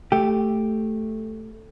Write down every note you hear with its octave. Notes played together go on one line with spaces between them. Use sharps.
A3 G4